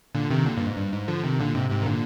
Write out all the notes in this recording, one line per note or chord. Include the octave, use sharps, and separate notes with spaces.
A#2 D3
C3 D#3
A#2 D3
G2 A#2
G#2
G2
G#2
D3 F3
C3 D#3
A#2 D3
G#2 C3
G#2 C3
D#3
A#2 D3